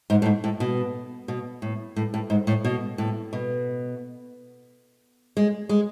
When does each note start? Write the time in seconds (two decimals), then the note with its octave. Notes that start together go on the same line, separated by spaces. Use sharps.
0.10 G#2
0.22 A2
0.26 G#2
0.44 A2
0.60 B2
1.28 B2
1.62 A2
1.96 A2
2.14 A2
2.30 G#2
2.47 A2
2.65 B2
2.98 A2
3.33 B2
5.37 G#3
5.69 G#3